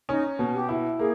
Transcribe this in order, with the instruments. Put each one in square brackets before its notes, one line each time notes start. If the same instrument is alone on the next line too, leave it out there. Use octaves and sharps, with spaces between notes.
[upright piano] C#4 [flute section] D#4
[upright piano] B2
[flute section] G4
[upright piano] E4
[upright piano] A#3 [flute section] G#4